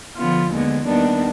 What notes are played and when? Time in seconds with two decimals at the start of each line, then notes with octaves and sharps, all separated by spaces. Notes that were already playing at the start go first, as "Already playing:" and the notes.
0.15 D3 F3 B3 F4
0.50 D#2 D3 G#3 B3
0.85 D#2 D#3 G3 B3 D4